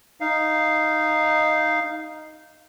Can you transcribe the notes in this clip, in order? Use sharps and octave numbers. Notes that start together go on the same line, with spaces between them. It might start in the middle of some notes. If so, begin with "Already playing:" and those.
D#4 F5